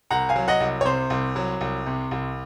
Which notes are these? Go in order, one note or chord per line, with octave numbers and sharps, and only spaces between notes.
C2 F#5 A#5
F5 G#5
F#3
D#5 F#5
C2
C#5
C3 C5
C2
F#3
C2
C3
C2